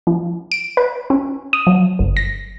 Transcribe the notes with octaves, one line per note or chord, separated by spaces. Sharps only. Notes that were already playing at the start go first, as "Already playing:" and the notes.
F3
D7
B4
C#4
D#6
F#3
G1
A#6